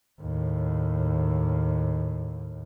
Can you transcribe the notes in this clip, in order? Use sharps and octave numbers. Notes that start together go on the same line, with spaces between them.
D#2 A2